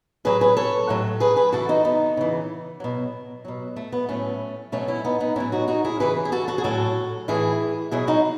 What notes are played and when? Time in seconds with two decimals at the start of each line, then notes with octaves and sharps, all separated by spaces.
0.25 A2 F#3 G#4 B4
0.41 G#4 B4
0.57 A4 C#5
0.89 A2 F#3
1.20 G#4 B4
1.36 G#4 B4
1.52 C#3 E3 F#4 A4
1.69 D#4 F#4
1.85 B3 D#4
2.17 C#3 E3
2.80 B2 F#3
3.45 B2 F#3
3.76 A3
3.92 B3
4.09 A2 F#3 A3 C#4
4.72 B2 F#3 A3 C#4
4.88 C#4 E4
5.05 B3 D#4
5.20 B3 D#4
5.36 A2 F#3 C#4 E4
5.52 D#4 F#4
5.68 D#4 F#4
5.84 E4 G#4
6.00 C#3 E3 G#4 B4
6.25 G#4
6.32 F#4 A4
6.48 F#4 A4
6.58 G#4
6.64 A2 F#3 F#4 A4
7.28 A2 E3 E4 G#4
7.91 B2 F#3 E4 G#4
8.07 D#4 F#4